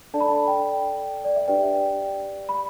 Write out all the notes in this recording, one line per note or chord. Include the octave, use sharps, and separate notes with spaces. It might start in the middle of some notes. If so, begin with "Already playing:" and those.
D4 A4 D5 A5
B5
A5
G5
D5
E5
D4 G4 B4 D5 G5
B5